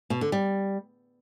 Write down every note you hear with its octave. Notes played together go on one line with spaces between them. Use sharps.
B2
D3
G3